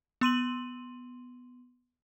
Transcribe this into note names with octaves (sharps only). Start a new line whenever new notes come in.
B3 C6 D#7 F#7